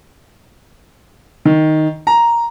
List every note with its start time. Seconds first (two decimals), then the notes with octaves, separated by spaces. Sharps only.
1.45 D#3
2.07 A#5